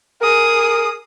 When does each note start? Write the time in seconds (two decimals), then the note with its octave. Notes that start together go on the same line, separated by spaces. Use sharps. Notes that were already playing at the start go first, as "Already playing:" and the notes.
0.21 G#4 A#4 D#6